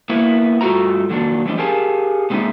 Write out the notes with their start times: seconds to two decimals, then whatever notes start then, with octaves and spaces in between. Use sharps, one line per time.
0.10 A#3 B3 E4 A#4
0.61 G2 A3 F4 F#4 C5 A#5
1.09 F2 A#2 D#3 F#3 D4
1.46 E3 F3 A3 D4 D#5
1.58 G4 G#4 A#4 F5 G#5 A5
2.30 A#2 G#3 C4 D4 D#4 E5